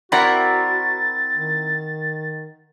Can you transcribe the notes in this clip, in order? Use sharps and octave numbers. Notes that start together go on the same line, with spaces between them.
C4 E4 F#4 A#4 D5 F#5 A6 A#6
D#3